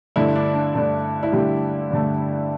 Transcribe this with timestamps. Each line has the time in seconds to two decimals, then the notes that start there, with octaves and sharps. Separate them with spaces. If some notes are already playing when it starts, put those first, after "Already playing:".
0.16 G2 D3 A3 E4
0.35 D4
0.54 D4
0.74 G2 D3 A3
1.23 E4
1.32 G2 D3 G3 A3 G4
1.90 G2 D3 A3